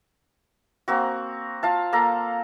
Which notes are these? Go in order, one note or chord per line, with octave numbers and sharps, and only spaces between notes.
A#3 C4 F#4
F4 F5 A5
A#3 A4 A#5